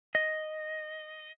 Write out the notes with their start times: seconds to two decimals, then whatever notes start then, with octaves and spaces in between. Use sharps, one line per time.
0.15 D#5